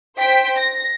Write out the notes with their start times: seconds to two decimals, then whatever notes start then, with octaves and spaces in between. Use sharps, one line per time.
0.19 C5 G5 B6
0.57 A#6